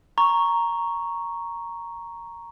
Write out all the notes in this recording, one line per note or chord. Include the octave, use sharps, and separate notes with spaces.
A#5 C#6